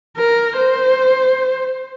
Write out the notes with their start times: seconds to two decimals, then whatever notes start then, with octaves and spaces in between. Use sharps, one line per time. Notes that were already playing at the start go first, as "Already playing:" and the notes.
0.17 A#4
0.57 C5